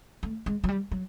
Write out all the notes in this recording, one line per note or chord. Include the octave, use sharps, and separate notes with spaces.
A3
G#3
F#3
G3
F#3